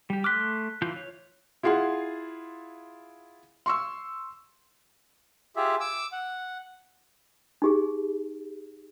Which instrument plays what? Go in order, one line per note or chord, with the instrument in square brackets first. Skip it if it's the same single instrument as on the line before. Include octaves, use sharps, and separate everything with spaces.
[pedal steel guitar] G3 G4
[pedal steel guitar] A3 C6 D6 [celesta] F6 F#6 B6
[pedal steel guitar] E3 F4 G6
C#5
[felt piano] E4 F4 G#4 F#5 C6
C6 C#6 E6
[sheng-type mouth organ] F4 G4 G#4 E5
D6 E6
F#5
[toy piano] D#4 G4 G#4